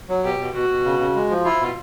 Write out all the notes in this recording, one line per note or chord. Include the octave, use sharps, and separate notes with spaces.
F#3
B2 G4
B2
B2 F#4
B2
C#3
C#3
G#3
F3
E4 F4
B2